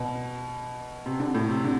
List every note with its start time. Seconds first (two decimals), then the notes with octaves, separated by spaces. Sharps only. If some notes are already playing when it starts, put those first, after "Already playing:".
Already playing: B2
1.06 C3
1.20 D3
1.35 A2
1.49 C3
1.64 D3